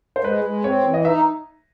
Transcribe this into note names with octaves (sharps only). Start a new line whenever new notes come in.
C5
G#3 B4
G#3
C4 C#5
E3
D#5
D#4 E5